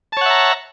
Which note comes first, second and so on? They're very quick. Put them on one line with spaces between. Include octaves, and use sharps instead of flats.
A5 C#5 F#5 E5 A#5